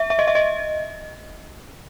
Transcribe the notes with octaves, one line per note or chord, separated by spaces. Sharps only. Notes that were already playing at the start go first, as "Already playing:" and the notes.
Already playing: E5
E5
D#5
E5
D#5